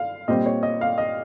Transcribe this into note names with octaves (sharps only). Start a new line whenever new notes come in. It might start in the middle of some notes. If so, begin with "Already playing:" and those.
Already playing: F5
A#2 G3 C4 D#5
C#5
D#5
F5
D#5